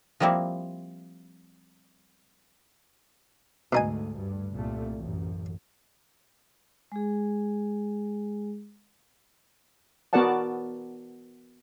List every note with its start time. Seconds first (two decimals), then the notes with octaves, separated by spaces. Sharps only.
0.20 F3 G3 A#3 C4 E4
3.73 D2 G#2 B2 D#4 G#5
4.15 G2
4.53 C2 A#2 A3
4.97 A1 F#2
6.92 G#3 G#4
10.13 B3 F#4 A#4 D5 F#5 A5